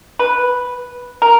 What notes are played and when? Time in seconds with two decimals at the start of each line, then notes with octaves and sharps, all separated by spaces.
0.19 B4
1.22 A#4